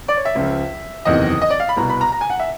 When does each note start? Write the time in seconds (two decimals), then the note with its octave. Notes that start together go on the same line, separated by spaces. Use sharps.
0.08 D5
0.17 C#5
0.25 E5
0.35 C#2 C#3 F3
1.05 F#1 E2 C3 D#3 D#5
1.41 D#5
1.50 D5
1.60 F5
1.69 B5
1.77 C2 B2 A#5
1.90 B5
2.01 A#5
2.12 A#5
2.21 G#5
2.30 F#5
2.39 E5